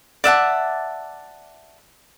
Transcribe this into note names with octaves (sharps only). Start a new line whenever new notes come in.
D5 E5 F#5 A5